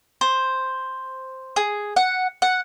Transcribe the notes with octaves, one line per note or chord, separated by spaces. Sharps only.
C5
G#4
F#5
F#5